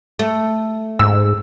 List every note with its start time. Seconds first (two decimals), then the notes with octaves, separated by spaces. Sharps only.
0.19 A3
0.99 G#2 E6